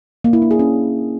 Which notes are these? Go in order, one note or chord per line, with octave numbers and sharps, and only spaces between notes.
A#3
E4
D4
G#4
C#4